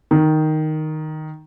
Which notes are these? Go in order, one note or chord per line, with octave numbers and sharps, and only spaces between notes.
D#3